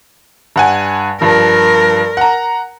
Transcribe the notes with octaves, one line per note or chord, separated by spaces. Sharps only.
G2 F#5 G#5
G2 F3 A#4
F#5 A#5